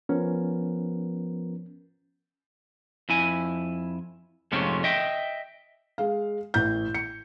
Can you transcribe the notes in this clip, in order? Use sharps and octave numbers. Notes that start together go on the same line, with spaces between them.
F3 B3 C#4 A#4
F2 E4 G#5
F2 G#2 C3 A3 C#4 F4
D#5 E5 G5
G#3 F5
A1 G6
C#7